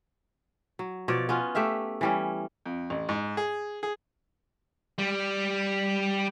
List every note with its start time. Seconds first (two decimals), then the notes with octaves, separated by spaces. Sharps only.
0.79 F#3
1.08 B2 F3 C#5 D5
1.29 B3 C#4 F4
1.55 A3 G4 E5 F5
2.01 E3 G3 C#4
2.66 F2
2.90 A1
3.09 G#2
3.37 G#4
3.83 G#4
4.98 G3